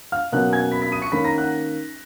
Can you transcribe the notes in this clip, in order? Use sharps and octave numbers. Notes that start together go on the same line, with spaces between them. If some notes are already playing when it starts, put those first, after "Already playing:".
F5 F6
B2 F#3 A#3 C#4 F#5 F#6
G#5 G#6
B5 B6
B5 B6
D#6 D#7
C#6 C#7
D#3 A#3 C#4 B5 B6
A#5 A#6
F#5 F#6